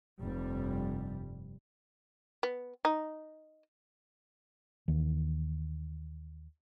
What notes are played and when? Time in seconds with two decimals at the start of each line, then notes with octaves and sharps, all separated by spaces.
0.21 F1 G2 G3
2.43 B3
2.85 D#4
4.88 D#2 D#3 E3